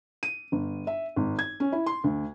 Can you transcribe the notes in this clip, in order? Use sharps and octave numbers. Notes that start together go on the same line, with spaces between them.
D#7
G1
E5
G#1
G#6
C#4
E4
C6
D2